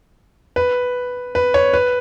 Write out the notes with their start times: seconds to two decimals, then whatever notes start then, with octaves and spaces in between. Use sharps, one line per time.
0.56 B4
1.35 B4
1.54 C#5
1.73 B4